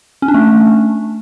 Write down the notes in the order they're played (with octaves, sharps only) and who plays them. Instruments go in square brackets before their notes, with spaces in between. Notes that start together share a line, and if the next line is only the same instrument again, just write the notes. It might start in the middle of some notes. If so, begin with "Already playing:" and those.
[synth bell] C#4
D4
A3